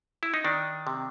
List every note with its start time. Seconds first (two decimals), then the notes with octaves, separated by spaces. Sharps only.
0.23 E4
0.34 D#4
0.44 D#3 D4
0.87 C3